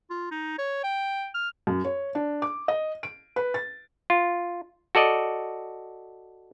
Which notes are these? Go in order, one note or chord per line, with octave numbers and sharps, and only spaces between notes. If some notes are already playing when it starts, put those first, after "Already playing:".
F4
D#4
C#5
G5
F6
F#2
C#5
D4
D6
D#5
D7
B4
A6
F4
F#4 A4 D5 D#5